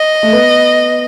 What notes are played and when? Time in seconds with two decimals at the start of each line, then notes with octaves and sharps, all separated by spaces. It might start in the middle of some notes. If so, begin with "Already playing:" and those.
Already playing: D#5
0.23 A3
0.33 B3